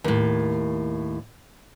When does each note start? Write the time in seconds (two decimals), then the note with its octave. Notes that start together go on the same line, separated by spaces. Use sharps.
0.04 D#2 A2